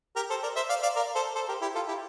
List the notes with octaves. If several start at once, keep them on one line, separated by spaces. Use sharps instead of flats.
G4 A#4
A4 C5
A#4 D5
C5 E5
D5 F5
D5 F5
A#4 D5
A4 C5
A4 C5
G4 A#4
E4 G4
F4 A4
E4 G4